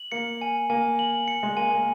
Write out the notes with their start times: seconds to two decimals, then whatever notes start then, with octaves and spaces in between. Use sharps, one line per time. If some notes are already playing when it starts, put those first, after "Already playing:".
Already playing: F#7
0.12 A#3 C#7
0.41 G#5
0.70 A#3 G#5
0.99 F#7
1.28 C#7
1.43 G#3
1.57 A#3 G#5
1.71 A#3